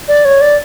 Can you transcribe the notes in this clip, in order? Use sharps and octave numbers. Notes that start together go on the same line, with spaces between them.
D5
C#5
D5